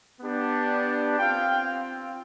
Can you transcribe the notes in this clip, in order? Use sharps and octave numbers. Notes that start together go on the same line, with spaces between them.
B3 D4 G4
C4 F4 F5 G5